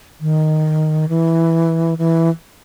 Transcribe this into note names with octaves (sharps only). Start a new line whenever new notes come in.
D#3
E3
E3